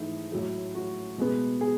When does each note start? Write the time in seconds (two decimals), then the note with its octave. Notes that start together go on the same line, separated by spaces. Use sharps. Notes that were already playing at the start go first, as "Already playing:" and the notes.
Already playing: G#2 E3 A3 D#4 E4
0.32 A2 F#3 A3
0.75 F#4
1.18 B2 G#3 B3
1.61 G#4